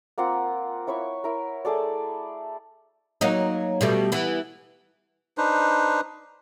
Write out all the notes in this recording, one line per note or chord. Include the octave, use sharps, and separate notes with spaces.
A#3 C4 F4 F#5
E4 C#5 B5 C#6
E4 A#4
A3 G#4 A4 D5
F#3 A#3 D#4
B2 G3 A3
E3 B3
D4 D#4 B4 C5